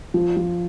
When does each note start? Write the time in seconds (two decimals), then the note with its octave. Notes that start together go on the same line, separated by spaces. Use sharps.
0.14 F3
0.37 F3